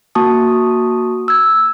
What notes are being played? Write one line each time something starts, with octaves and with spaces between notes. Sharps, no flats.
A#3 F#4 A5 C#6 D#6
E6 G#6